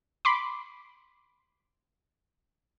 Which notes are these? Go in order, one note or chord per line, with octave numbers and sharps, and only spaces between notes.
B5 C6 D6